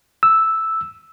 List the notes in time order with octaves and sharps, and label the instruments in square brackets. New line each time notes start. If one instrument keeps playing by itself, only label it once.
[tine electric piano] E6